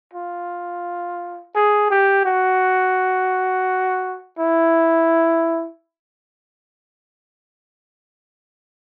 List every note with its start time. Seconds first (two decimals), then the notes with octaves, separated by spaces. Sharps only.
0.14 F4
1.55 G#4
1.91 G4
2.25 F#4
4.39 E4